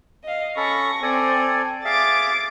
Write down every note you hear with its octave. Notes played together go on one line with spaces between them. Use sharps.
D#5 F5
C#4 A4 B5 C#6 A#6
C4 A4 D5 G#5
G#4 E5 F5 D6 A6